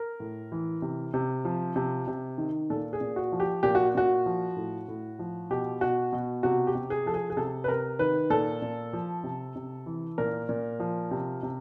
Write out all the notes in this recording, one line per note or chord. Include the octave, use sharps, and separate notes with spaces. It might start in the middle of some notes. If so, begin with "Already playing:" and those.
Already playing: A#4
A2
E3
C3
C3
F3
C3
C3
D#3
A#2 A4
G#4
A#2
F#4
F3
G4
A#2 G4
F#4
A#2 F#4
F3
A2
A2
F3
B2 G4
B2 F#4
B2
C3 F#4
G4
C3
G#4
F3 A4
G#4
G#4
C3 A4
B4
C3 A#4
D#3 B4
A#2 A4
A#2
F3
C3
C3
E3
A#2 A#4
A#2
F3
C3
C3